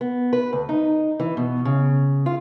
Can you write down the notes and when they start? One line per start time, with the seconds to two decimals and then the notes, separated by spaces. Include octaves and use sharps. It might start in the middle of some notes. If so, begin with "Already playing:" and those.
0.01 B3
0.33 B4
0.53 D2
0.69 D#4
1.20 E3
1.37 B2
1.65 C#3
2.26 F4